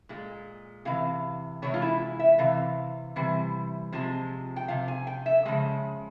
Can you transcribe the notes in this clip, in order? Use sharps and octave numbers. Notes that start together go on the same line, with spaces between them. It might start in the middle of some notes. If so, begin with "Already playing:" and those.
A#2 G#3
C3 E3 F5
C3 E3 G#3 C#5
F4
E4
E5
C3 E3 F5
C3 E3 G3
C3 F3 G#3
G5
C3 F3 F5
G#5
G5
E5
C#3 F3 G#3